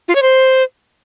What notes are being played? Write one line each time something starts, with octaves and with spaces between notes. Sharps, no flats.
F4
C#5
C5